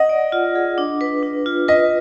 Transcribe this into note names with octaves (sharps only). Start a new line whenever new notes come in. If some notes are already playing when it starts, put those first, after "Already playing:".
Already playing: D#5 F#5
D5
F4
G#4
D4
B4
D4
F4
B4 D#5